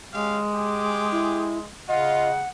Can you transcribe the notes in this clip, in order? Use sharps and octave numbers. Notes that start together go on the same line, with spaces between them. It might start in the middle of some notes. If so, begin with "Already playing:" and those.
G#3 C#4 G4 F5
G4 G#4 D6
E4
C#3 F4 D#5 F#5